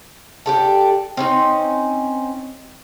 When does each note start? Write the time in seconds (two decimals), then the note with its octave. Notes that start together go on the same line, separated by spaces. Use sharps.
0.46 D4 G4 A4
1.17 C4 C#4 D#4